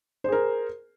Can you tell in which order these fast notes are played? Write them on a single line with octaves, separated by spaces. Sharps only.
C5 G#4 A#4